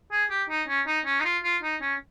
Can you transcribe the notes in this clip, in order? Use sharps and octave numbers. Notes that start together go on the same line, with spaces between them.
G#4
G4
D#4
C#4
D#4
C#4
D#4
F4
F4
D#4
C#4